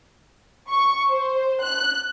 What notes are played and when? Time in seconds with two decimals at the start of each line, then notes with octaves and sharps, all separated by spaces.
0.69 C#6
1.09 C5
1.62 F#6